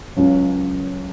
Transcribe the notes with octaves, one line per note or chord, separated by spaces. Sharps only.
C#2 C#3 F#3 C#4